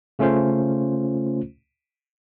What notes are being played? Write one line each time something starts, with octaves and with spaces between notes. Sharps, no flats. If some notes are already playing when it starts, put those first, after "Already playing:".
C#3 A3 C#4 F4 C5